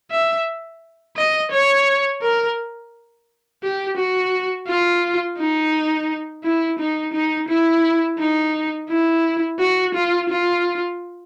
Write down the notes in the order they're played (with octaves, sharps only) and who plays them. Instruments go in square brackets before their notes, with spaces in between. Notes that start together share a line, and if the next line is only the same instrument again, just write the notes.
[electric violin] E5
D#5
C#5
A#4
G4
F#4
F4
D#4
E4
D#4
D#4
E4
D#4
E4
F#4
F4
F4